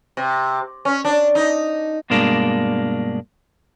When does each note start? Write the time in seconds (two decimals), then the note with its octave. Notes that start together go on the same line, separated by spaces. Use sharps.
0.17 C3
0.85 C#4
1.05 D4
1.35 D#4
2.10 G2 B2 G#3 A#3 D4